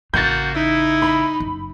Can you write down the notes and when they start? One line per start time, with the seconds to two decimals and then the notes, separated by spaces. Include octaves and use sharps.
0.14 A1 C#3 A#3 F#4 G6 A6
0.54 D#4 E4
1.02 B5
1.40 F#1